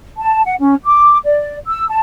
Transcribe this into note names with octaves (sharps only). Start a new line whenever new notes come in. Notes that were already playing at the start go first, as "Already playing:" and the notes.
A5
F#5
C#4
D6
D5
E6
A5